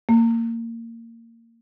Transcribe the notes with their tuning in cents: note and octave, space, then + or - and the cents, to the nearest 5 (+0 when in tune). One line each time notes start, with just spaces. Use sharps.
A#3 -20